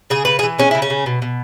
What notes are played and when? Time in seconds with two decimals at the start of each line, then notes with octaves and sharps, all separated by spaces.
0.10 C#3 G#4
0.25 C#3 B4
0.39 G#4
0.43 E3
0.59 G#3 C#4
0.71 C#3 E4
0.82 C#4
0.90 C#3
1.06 B2
1.22 B2